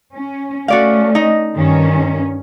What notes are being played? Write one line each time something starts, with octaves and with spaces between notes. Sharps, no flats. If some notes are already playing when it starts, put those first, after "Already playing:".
C#4
A3 C#4 F#4 D5 F5
D#4 D#5
G2 D#3 C#4